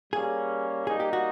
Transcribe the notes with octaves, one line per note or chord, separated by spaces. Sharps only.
G3 A#3 C#4 G#4
G3 A#3 D#4 G#4
G4
F#4